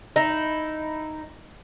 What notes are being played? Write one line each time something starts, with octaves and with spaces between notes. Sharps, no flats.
D#4 E4